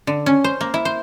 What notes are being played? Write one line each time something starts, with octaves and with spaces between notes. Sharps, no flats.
D3
C#4
C5
A#3
E4
C5